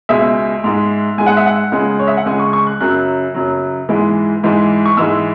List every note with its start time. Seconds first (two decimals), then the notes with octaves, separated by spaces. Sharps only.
0.09 C#2 B2 G#3 E5
0.64 G#2 G#3
1.18 G#2 G#3 G#5
1.26 F#5
1.37 E5
1.46 F#5
1.72 C#2 C#3 G#3
1.99 C#5
2.08 E5
2.17 F#5
2.26 C#2 C#3 G#3 G#5
2.39 C#6
2.53 C#6
2.67 F#6
2.81 F#2 C#3 F#3 F#6
3.34 F#2 C#3 F#3
3.89 G#2 E3 G#3
4.43 G#2 E3 G#3
4.86 C#6
4.97 G#2 E3 G#3 E6